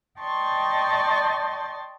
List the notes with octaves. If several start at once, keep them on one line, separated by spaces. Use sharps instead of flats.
D5 D#5 G5 A5 C6 C#6